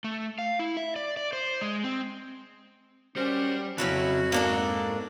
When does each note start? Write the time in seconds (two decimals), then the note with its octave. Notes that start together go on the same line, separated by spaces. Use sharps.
0.04 A3
0.39 F5
0.59 E4
0.77 E5
0.96 D5
1.17 D5
1.33 C5
1.61 G#3
1.84 C4
3.16 G3 C#4 F#4 A#4 C5
3.78 F2 C#3 F#3 C#4 E4 F#4 B4
4.32 G#2 A#3 D4 A4